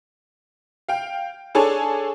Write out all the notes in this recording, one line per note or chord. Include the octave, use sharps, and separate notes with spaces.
F5 G5
D4 G#4 A4 C#5 G#5 A5